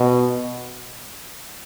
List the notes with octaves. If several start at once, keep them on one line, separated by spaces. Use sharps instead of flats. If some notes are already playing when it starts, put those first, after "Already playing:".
Already playing: B2